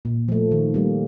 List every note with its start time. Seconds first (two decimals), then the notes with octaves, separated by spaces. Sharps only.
0.05 A#2
0.28 F3 A3
0.51 D#3
0.74 G3 A#3